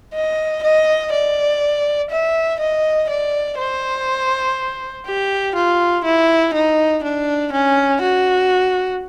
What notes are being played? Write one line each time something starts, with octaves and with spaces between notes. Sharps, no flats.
D#5
D#5
D5
E5
D#5
D5
C5
G4
F4
E4
D#4
D4
C#4
F#4